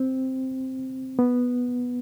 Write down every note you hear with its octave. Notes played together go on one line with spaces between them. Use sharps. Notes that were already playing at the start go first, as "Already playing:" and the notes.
Already playing: C4
B3